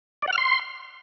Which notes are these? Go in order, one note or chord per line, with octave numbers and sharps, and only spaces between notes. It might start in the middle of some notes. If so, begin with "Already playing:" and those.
D5
F#5
F6
C6